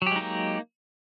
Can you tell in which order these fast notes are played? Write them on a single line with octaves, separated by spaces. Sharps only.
F#3 G4 G#3 D#4 A#3